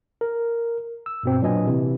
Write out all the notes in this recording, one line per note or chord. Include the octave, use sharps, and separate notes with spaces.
A#4
E6
G2 B2 C4
A#2 F#3 D4 B4 D#5 G#5
C3 E3